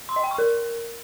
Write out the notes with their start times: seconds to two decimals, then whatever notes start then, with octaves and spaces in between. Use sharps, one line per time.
0.09 C6
0.16 D#5
0.24 G5
0.31 C#6
0.38 A#4